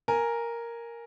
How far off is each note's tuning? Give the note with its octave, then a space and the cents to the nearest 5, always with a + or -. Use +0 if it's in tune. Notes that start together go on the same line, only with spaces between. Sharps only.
A#4 +0 G#5 +0